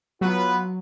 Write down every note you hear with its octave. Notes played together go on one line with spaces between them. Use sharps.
F#3 B3 F4 B4